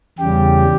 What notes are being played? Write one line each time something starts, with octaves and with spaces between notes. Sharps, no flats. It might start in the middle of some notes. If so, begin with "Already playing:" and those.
E2 C#3 G3 G4